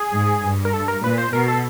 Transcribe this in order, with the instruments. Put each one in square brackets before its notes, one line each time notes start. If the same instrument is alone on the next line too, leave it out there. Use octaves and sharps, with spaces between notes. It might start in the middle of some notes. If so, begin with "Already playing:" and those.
Already playing: [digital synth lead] G#4
[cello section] G#2
G2
[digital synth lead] A#4
A4
A#4
[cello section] A#2 [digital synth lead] B4
[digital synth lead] C5
[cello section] B2 [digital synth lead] A#4
[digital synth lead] A4